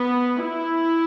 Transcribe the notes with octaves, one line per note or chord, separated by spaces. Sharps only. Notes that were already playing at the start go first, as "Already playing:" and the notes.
Already playing: B3
E4